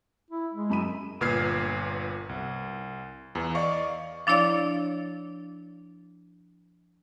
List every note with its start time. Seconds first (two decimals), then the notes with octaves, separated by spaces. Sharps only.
0.30 E4
0.54 G#3
0.70 F#2 B5 D#7
1.21 G1 A#2 B4 F6 G#6 C7
2.29 C2
3.35 E2 E3
3.55 D5 D#5 F5 C#6 D6
4.27 F3 D4 E4 C#5 D5 F5